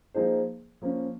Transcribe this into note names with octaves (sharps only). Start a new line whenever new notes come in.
F3 A#3 D#4 G#4 C5
F3 A#3 C#4